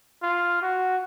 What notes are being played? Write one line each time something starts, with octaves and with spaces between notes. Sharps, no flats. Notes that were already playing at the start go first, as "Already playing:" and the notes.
F4
F#4